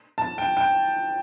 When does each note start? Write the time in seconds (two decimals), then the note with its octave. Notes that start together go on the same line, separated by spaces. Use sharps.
0.18 A5
0.38 G5
0.57 G5